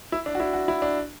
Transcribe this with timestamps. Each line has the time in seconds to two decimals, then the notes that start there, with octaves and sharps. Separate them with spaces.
0.12 E4
0.26 D4
0.35 F#4
0.40 E4
0.53 F#4
0.68 E4
0.82 D4